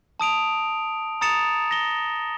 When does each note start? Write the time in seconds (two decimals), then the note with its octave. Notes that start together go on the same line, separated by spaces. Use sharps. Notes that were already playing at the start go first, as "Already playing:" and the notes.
0.20 A5 D#6 D7 F7
1.21 A#5 D#6 A6 C#7 E7 F7
1.71 A#6 G7